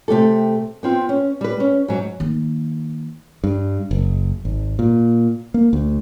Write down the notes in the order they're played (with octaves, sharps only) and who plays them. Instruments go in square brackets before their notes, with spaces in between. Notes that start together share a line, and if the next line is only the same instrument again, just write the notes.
[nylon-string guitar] C3 A3 G4 A4
B3 C4 F4
C#4
G3 B4
C#4
G#2 F#3
[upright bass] D#3 A#3
[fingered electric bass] G2
F#1
G#1
A#2
A#3
D2